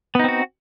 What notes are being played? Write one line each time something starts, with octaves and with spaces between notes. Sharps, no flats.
B3 C4 D#4 F#4